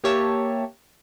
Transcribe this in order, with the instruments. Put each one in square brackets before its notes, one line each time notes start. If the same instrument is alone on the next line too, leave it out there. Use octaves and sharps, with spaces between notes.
[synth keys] A#3 G4 C#5 E5 A5